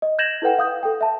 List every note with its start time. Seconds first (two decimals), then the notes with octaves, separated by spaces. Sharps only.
0.02 D#5
0.19 G6 G#6 A#6 E7 F#7
0.42 E4 A4 B4 F#5 G5
0.58 F5 D#6 G6
0.83 A4 G5
1.01 E5 A5